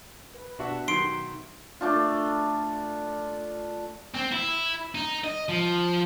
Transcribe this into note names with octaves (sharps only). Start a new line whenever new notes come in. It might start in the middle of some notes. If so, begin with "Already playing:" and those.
B4
B2 D4 F#4 E5 F#5
D#3 F#3 C6 C7 D7
A3 D4 F4
C4
E4
D#4
D#5
F3